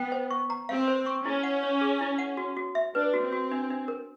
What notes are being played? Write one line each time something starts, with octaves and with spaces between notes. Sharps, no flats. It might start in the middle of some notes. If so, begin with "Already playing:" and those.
Already playing: B3 G5
C5
C#6
A#5
C4 F5
C5
C#6
C#4 E4
F#5
C#5
G#4
E4
F#5
F#4
F#4
E5
D4 B4
F#4
C4
F#4
D4
D4
A#4